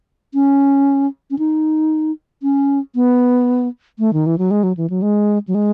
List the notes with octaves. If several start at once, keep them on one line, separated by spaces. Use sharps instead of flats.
C#4
C#4
D#4
C#4
B3
A3
D#3
E3
F#3
G#3
F#3
E3
F#3
G#3
F#3
G#3